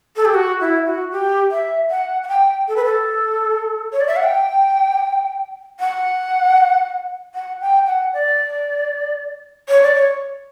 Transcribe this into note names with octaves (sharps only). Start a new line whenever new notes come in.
A4
G4
F#4
E4
F#4
G4
E5
F#5
F#5
G5
A4
B4
A4
C#5
D5
E5
F#5
G5
F#5
F#5
G5
F#5
D5
C#5
D5
C#5